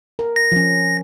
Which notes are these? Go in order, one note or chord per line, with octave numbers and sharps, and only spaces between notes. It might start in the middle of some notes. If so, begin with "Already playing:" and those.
A#4
A#6
F3 C#4